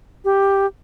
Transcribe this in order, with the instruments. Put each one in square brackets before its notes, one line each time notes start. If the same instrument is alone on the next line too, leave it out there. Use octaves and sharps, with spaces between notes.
[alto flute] G4